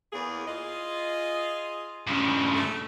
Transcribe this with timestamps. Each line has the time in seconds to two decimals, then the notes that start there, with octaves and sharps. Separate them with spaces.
0.12 E2 A#3 G#4
0.47 F4 G#4 D#5
2.07 G2 C#3
2.55 A3